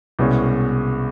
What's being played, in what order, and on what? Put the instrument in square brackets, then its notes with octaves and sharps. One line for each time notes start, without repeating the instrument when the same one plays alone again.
[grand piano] C2 B2 G#3 C#4